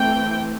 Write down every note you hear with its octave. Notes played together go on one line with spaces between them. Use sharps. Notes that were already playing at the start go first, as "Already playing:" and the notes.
Already playing: E3 A3 C4 G5